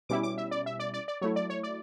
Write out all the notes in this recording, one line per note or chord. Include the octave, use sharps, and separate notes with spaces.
B2 G3 C#4 E4 D6
D6
E5
D5
E5
D5
D5
D5
F#3 A3 E4 C#5
D5
C#5
D5